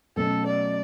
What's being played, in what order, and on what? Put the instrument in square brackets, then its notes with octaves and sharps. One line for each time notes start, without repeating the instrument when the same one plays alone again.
[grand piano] B2 F#3 A3 C#4 [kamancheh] A4
[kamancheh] D5